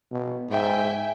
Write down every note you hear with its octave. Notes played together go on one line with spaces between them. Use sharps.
B2
G#2 E5 G5 G#5